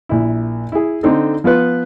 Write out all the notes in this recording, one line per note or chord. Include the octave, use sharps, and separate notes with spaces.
A#1 E4
E4 G#4
D3 C4 D#4 A4
F3 B3 F4 B4